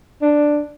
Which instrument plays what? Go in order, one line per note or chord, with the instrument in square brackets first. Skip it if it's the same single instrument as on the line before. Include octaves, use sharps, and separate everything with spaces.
[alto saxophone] D4